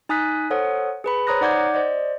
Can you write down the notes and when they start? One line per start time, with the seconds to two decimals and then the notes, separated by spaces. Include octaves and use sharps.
0.09 D#4 G#5 D#6 F#6 B6
0.50 A4 C5 C#5 F#5 D#6
1.04 G#4 B4 B5
1.27 C5 C#5 A#5 D#6 F#6 A#6
1.41 D#4 D5 F#5 D6 G6 G#6
1.74 C5 D5 D#5